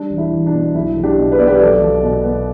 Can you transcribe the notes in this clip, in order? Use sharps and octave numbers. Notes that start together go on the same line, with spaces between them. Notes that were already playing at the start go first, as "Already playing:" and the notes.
Already playing: G3 D4
E1
E4
E2
D4
B2
B1 E4
B1
D4 G4
B2
B4
B3 D5
G4 B4
B1 A4 D5
B1
B2
B3